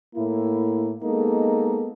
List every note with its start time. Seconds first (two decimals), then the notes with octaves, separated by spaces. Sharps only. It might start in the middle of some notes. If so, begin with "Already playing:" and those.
0.16 A2 A#3 E4
1.04 G#3 A#3 B3 D#4 A4